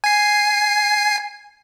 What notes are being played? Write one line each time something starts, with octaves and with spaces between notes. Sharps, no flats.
G#5 C7